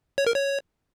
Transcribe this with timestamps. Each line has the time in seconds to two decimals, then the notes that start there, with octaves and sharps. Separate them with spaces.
0.18 C#5
0.27 A#4
0.35 C#5